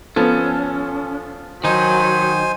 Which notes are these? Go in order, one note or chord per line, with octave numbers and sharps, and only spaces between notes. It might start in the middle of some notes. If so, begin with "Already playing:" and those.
F3 B3 C#4 A4
D#3 F#3 D#4 C5 G#5